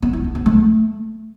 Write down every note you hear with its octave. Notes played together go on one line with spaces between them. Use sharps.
B3
E4
D4
B3
A3